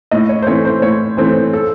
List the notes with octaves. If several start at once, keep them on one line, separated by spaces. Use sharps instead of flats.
A2 D#5
C#5
C5
E3 A3 C4 C#5
C5
A2 C#5
E3 A3 C4 C5
A4